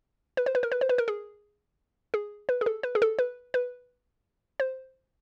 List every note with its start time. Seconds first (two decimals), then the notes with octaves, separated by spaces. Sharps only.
0.37 B4
0.46 C5
0.55 B4
0.63 A#4
0.72 B4
0.81 C5
0.89 B4
0.98 A#4
1.08 G#4
2.14 G#4
2.49 B4
2.61 G#4
2.66 A4
2.83 B4
2.95 G#4
3.02 A4
3.19 B4
3.54 B4
4.60 C5